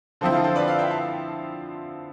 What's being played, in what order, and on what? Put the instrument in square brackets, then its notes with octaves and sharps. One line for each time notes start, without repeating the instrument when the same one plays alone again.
[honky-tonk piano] D3 F3 C4 E4 [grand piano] A4 C5
[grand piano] F4 A4
A4 C5
B4 D5
D5 F5
E5 G5
F5 A5